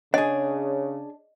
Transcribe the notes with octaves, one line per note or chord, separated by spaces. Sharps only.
C#3 D4 G#4 C#5 D#5